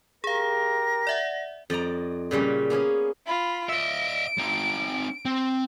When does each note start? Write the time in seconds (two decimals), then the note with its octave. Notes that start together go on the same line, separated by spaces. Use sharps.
0.24 G4 G#4 A#4 F5 A#6
1.07 D5 E5 F#5
1.70 F2 D5 D#5 A#5
2.31 A#2 C#3 G3 C#4
2.70 A#3 B3 C#4 G#4
3.26 F4 B5
3.69 D#5 E5 D7
4.38 C4 D#4
5.25 C4